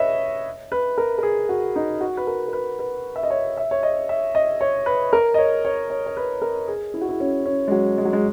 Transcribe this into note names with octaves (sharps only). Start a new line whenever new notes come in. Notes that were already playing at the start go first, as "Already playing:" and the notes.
Already playing: B4 C#5 D#5 E5
B4
A#4
A#4
G#4
F#4
D#4
F#4
B4
A#4
A#4
B4
B4
E5
D#5
C#5
E5
C#5
D#5
E5
D#5
C#5
B4
A#4
D#5
C#5
C#5
C#5
C#5
B4
A#4
G#4
E4
F#4
E4
C#4
C#4
G#3
F#3
G#3
F#3
G#3